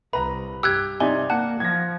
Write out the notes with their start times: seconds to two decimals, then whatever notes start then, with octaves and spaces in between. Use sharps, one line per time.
0.13 C2 B4 A#5 B5
0.63 G2 G4 E6 F#6 G#6
1.00 C3 D#4 D5 G#5 G7
1.30 A#3 F#5 A5
1.60 F3 G#6 A#6